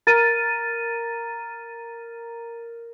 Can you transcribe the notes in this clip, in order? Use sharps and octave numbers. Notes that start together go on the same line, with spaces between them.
A#4 A6 D#7